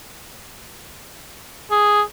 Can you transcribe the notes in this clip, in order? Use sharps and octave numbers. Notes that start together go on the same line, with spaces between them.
G#4